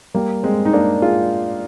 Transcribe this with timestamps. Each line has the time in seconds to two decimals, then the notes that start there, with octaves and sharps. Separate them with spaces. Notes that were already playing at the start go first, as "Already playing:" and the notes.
0.14 G3 A#3
0.43 G#3 C4
0.65 D#4
0.73 A#3 D4
1.02 F4 G#4